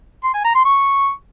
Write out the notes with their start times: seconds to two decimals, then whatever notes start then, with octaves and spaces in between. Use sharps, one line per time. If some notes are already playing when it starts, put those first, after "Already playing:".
0.24 C6
0.34 G#5
0.44 A#5
0.55 C6
0.65 C#6